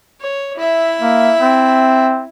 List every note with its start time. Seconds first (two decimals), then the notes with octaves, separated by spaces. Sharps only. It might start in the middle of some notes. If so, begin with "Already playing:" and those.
0.20 C#5
0.57 E4 E5
1.01 A#3
1.40 C4